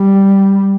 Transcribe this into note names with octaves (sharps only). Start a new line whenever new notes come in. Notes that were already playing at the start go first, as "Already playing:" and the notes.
Already playing: G3